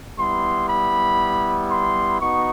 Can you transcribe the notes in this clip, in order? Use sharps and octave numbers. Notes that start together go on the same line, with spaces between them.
G3 B3 E4 C6
B5
C6
B3 D#4 F#4 C#6